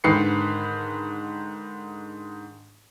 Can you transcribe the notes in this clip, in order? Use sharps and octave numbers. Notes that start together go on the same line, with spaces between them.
G#2 D3 D#3 B4 C7 C#7